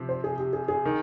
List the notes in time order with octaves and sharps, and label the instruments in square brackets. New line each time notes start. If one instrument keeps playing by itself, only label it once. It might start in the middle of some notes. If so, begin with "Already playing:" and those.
Already playing: [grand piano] C3 F3 C4
[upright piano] C5
G#4
G4
G#4
G#4
[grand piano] D#3